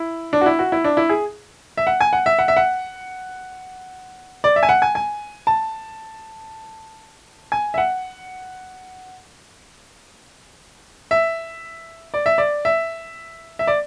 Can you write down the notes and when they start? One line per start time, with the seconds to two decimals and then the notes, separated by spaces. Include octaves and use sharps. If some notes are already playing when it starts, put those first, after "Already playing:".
Already playing: E4
0.33 D4
0.41 F#4
0.46 E4
0.59 F#4
0.72 E4
0.84 D4
0.97 E4
1.09 G#4
1.77 E5
1.87 F#5
2.01 G#5
2.13 F#5
2.26 E5
2.39 F#5
2.48 E5
2.57 F#5
4.44 D5
4.56 E5
4.63 G#5
4.69 F#5
4.82 G#5
4.95 G#5
5.47 A5
7.52 G#5
7.74 E5
7.78 F#5
11.11 E5
12.14 D5
12.26 E5
12.38 D5
12.65 E5
13.59 E5
13.67 D5